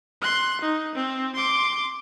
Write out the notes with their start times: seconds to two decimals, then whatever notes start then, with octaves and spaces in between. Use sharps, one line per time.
0.22 C6 F#6
0.61 D#4
0.95 C4
1.36 C6 D6